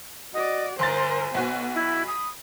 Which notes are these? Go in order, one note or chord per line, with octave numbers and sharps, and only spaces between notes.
F#4 D5 D#5
G1 A#4 C5 G#5 C6 A6
B1 B3 F#4
E4 B5
D#6